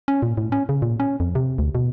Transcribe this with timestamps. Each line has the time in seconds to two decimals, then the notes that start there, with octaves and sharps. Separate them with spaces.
0.08 C#4
0.22 A#2
0.37 A2
0.52 C#4
0.69 C#3
0.82 A#2
1.00 C#4
1.20 F2
1.35 C3
1.58 D2
1.75 B2